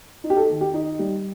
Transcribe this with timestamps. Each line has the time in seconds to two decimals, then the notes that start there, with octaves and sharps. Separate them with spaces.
0.24 D#4
0.30 G4
0.37 A4
0.50 D#3
0.61 G4
0.74 D#4
0.99 G3